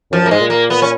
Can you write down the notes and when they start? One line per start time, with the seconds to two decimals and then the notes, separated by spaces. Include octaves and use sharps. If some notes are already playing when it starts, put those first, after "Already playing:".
0.11 F#2 F3
0.22 F#2
0.26 A#3
0.31 G#2 G#3
0.41 A#2
0.50 A#3
0.70 B3
0.82 C#4